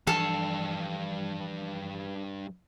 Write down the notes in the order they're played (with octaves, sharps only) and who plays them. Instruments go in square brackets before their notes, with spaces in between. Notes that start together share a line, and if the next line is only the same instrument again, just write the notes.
[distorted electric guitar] G2 F5 [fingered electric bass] E3 F3 [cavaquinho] A4